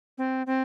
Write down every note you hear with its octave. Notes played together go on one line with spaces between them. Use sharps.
C4
C4